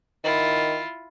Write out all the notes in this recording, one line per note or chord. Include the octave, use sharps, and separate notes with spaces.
D#3 E4 F4